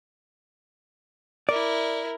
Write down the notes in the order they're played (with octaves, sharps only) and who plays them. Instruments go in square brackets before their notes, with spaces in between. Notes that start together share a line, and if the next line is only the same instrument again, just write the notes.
[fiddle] E4 A#4 [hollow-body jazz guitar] D5